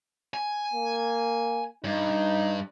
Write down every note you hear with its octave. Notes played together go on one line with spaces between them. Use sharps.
G#5
A#3
G2 D#4